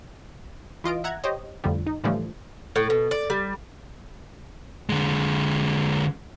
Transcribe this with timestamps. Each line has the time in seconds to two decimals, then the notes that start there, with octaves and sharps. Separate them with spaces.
0.84 E3 F4 D#5 D7
1.04 E5 F#5 A#5 F#6 G#6
1.24 G4 C5 C#5 D#5
1.64 F2 A2 D3 F3 G3
1.87 D#4
2.04 A2 D3 E3 F3 G3 A3
2.76 A2
2.90 B2
3.11 D5
3.30 G3
4.89 D3 G#3